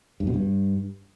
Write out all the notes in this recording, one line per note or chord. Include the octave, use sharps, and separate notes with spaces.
G2
B2
G2